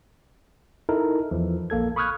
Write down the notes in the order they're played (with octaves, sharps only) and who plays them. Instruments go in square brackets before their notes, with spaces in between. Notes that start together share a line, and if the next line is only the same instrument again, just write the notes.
[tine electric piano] D#4 E4 A4 A#4
E2 E3 F3
A#1 A#3 A4 G#6
B5 C#6 D#6 F6 F#6 G#6